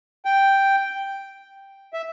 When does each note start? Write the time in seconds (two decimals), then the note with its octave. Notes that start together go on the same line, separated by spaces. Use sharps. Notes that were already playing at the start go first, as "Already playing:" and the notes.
0.25 G5
1.93 E5